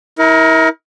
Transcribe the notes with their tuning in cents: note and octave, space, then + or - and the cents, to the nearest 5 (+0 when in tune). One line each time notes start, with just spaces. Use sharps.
E4 -35 A#4 +15